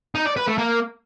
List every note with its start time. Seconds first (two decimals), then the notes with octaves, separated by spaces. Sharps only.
0.15 D#4
0.26 D5
0.37 B4
0.47 A3
0.58 A#3